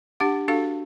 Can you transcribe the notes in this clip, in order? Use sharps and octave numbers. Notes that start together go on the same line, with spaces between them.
D4 G4 F#5
D4 F#4 A4 F5